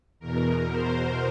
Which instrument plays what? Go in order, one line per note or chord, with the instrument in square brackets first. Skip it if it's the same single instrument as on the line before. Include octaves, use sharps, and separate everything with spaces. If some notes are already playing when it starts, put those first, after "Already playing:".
[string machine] E2 B2 A#4
C5